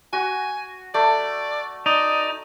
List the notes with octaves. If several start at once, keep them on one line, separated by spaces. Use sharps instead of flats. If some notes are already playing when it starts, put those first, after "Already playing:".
F#4 G#5
A3 D5
D#4 D5